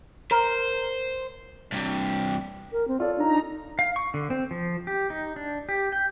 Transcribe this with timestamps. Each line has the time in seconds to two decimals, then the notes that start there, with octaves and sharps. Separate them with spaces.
0.31 A#4 C5
1.72 G2 C3
2.72 A#4
2.88 C4
3.00 F4 A4 C#5 D5
3.17 D4 D#4 A#5
3.29 D4
3.79 F5
3.96 C#6
4.14 D3
4.30 C4
4.51 F3
4.87 G4
5.10 D#4
5.36 D4
5.69 G4
5.92 G5